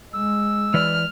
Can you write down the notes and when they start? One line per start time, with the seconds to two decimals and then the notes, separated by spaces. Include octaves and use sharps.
0.14 G#3 E6
0.74 E3 B4 D5 F6